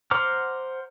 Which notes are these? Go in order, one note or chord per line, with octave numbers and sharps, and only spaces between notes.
C5 F#5 A#5 D6 F6